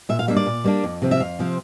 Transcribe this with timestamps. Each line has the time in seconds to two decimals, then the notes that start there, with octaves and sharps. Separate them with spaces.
0.09 A#2 E5
0.19 F5
0.28 G3 A#3 D4 E5
0.36 D5
0.46 A#2
0.64 G3 A#3 D4
0.84 F2
1.02 C3 F3 C4
1.11 E5
1.20 F2 F5
1.39 C3 F3 C4